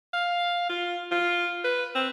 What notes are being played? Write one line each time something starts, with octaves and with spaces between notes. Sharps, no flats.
F5
F4
F4
B4
C4